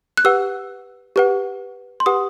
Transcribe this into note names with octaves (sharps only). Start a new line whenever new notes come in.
F#6
G4 B4 F#5 E6
G4 B4 F#5
C6
G4 B4 F#5 D#6